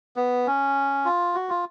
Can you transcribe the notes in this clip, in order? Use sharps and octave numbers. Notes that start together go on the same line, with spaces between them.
B3
C#4
F4
F#4
F4